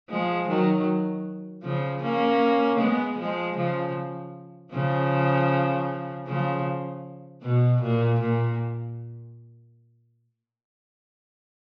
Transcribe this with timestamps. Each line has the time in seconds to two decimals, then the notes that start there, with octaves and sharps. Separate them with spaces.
0.09 F3 G#3
0.48 D#3 F#3
1.63 C#3 F3
2.02 A#3 C#4
2.79 G#3 B3
3.18 F3 G#3
3.57 C#3 F3
4.72 C#3 F3
6.27 C#3 F3
7.43 B2
7.81 A#2
8.20 A#2